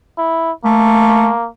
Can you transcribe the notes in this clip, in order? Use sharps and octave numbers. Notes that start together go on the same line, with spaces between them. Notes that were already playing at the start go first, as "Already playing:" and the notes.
E4
A3 A#3